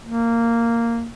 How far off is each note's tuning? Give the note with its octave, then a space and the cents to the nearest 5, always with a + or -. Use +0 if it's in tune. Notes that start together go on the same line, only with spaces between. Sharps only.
A#3 -10